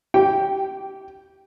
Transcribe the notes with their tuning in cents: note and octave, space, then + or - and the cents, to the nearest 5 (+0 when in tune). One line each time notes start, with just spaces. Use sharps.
G4 -20 G5 +0